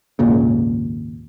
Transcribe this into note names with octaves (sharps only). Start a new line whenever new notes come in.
G#1 D#2 A#2 C#3